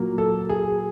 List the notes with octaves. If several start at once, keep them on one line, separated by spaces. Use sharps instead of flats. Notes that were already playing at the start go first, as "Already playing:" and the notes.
Already playing: A#2 F#3 A#3
A4
G#4